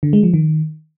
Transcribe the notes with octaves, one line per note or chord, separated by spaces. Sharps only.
D3
G#3
F3
D#3